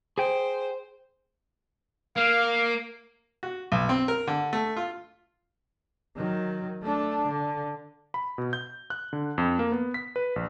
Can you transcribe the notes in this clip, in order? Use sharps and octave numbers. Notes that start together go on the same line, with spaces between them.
G#4 C5 G5
A#3 F5
F#4
B1
C4
A#4
D3
A3
F4
D#3 F#3
A3 D4
D3
B5
B2
G6
F#6
D3
F2
A#3
B3
B6
B4
A#1